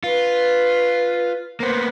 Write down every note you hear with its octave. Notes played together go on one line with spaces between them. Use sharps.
F4 B4
A#3 B3 C5